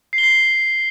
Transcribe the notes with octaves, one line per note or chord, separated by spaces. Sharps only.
C7
G7
C7